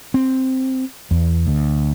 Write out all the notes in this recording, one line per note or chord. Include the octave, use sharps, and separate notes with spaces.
C4
E2
D2